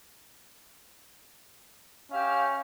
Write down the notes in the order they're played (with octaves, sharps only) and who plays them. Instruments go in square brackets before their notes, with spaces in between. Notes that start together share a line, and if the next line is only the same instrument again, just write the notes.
[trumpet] C#4 [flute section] G4 E5 F5